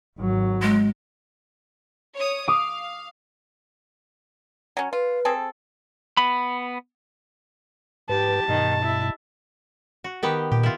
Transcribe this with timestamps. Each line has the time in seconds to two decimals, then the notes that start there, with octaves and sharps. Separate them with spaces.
0.19 G#1 F#3
0.62 G#3
2.16 C#5 D#6
2.48 F5 D6 D#6
4.77 F#3 C#4
4.93 F4 B4
5.25 C4 G#4 A4
6.17 B3 B5
8.09 G#2 G4 B4 A5
8.48 G2 B2 D#3
8.84 E4
10.04 F#4
10.23 D#3 B3 G4
10.52 A#2 G4
10.63 E4 F4